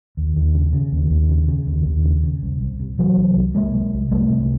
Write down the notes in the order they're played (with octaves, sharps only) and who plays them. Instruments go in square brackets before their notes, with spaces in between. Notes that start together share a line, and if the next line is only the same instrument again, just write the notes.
[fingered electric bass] D#2
D#2
C#3
C#3
D#2
D#2
C#3
C#3
D#2
D#2
C#3
C#3
C2
C2
C3
C3 E3 F#3
C2
C2
C3 G#3 A#3
C3
C2
C2 G3 A3
C3